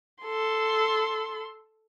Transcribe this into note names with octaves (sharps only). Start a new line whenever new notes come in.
A4 C6